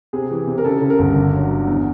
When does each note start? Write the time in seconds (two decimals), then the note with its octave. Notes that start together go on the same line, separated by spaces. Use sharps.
0.13 C3 G#4
0.31 E3
0.47 C3
0.58 A#4
0.65 C#3 A4
0.82 C#3
0.90 A#4
0.99 G1
1.16 D3
1.33 F#3
1.50 D3
1.67 E2